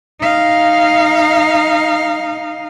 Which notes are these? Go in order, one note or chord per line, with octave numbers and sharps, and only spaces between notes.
D#4 F5